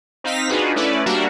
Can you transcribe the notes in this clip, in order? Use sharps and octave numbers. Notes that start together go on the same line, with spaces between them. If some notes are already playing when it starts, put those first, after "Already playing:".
C4 D#4 F5 A#6 B6
D4 D#4 F4 F#4 G#4 B4
A3 C#4 E4 B4 D5 E5
G3 A#3 D4 F#4 A#4 E5